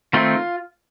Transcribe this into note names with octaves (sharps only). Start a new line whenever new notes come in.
D#3 A3 C4 F4